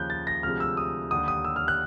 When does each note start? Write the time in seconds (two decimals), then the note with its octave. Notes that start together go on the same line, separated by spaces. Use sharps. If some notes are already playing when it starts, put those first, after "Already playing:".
Already playing: D#2 C#3 F3 F#6 G6
0.10 A6
0.27 A#6
0.43 D2 C3 F3 G#3 F6
0.60 E6
0.77 D#6
1.11 D#2 D3 G3 D#6
1.28 D#6
1.45 E6
1.56 F6
1.68 F#6